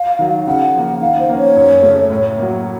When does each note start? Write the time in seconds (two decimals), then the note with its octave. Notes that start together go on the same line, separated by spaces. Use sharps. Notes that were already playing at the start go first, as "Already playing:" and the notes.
Already playing: F5
0.19 D#3 F#3
0.47 C#3 F#5
0.75 F3 A#3
1.01 D#3 F5
1.20 C5
1.29 A#3 C#4
1.38 C#5
1.57 F#2
1.83 C#3 A3
2.10 A2
2.38 F#3 A#3